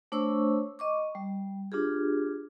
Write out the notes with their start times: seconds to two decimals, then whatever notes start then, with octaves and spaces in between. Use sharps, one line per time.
0.12 A3 D4 C5 C#5 C#6 E6
0.79 D#5 C#6 D6
1.15 G3
1.72 D4 F4 G4 G#4